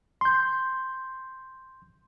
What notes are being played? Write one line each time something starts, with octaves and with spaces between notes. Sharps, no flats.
C6 G6